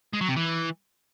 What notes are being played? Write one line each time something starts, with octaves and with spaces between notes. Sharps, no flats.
G#3
F#3
C3
E3